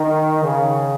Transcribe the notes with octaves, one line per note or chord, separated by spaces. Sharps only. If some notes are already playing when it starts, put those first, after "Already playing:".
Already playing: D#3
C#3